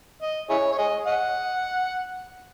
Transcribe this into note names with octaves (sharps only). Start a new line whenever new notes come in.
D#5
E4 G#4 C#5
C#5
G#4 D#5
D#5 F#5